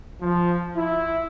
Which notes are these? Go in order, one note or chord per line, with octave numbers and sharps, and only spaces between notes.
F3
E4